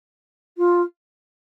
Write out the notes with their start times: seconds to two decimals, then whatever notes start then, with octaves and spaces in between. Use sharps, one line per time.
0.57 F4